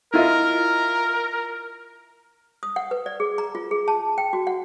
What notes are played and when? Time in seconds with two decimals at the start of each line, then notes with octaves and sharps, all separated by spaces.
0.14 E4 F4 A#4 D#5
2.63 D#6
2.76 F#5
2.91 B4
3.06 D5
3.20 G#4
3.38 A#5
3.55 F4
3.71 G#4
3.88 A5
4.18 G5
4.33 F#4
4.47 F#5